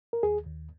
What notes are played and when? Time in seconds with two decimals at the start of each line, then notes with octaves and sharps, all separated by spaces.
0.13 A#4
0.23 D#2 G#4
0.46 D#2